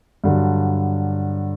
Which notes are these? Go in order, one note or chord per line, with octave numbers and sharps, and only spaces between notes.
G2 D3 F#3